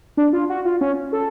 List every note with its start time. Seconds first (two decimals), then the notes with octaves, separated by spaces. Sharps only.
0.17 D4
0.33 F4
0.49 F#4
0.65 F4
0.81 C#4
1.12 A4